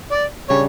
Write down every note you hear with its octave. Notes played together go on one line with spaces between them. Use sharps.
D5
C#3 G3 D4 C#5